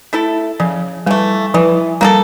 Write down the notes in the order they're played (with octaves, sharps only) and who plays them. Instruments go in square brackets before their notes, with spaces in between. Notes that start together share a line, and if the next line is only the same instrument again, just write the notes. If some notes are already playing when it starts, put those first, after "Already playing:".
[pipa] A3 E4 A4
[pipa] C#3 [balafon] F3
[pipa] E3 A3 [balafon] G3
[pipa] E3 [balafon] F3
[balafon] G3 [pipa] A#3 E4 A4